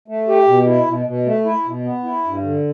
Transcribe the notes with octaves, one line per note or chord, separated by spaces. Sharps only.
A3
G4
B2
E4
B2
B2
A3
E4
B2
B3
E4
G2
D3